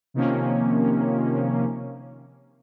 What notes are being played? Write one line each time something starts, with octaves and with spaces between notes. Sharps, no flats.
C3 D#3 F3 A#3 C#4